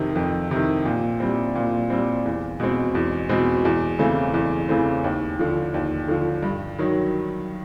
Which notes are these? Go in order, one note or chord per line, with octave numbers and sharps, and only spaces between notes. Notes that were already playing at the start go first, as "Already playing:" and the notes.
Already playing: F2 C3 D#3
F2
C3 D#3
A#2
G3 C4
A#2
G3 C4
E2
B2 G#3 C4
E2
B2 G#3 C4
E2
C#3 E3 A3 C4
E2
C#3 E3 A3 C4
D#2
D3 F3
D#2
D3 F3
G2
D#3 F#3